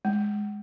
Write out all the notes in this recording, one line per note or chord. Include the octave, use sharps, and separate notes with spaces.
G#3